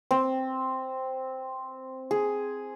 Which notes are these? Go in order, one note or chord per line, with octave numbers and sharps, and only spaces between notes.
C4
G#4